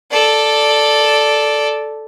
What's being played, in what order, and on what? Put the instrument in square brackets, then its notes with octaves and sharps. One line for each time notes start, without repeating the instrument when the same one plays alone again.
[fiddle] A4 D5